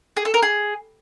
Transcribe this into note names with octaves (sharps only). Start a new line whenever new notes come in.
G#4
A4
A#4
G#4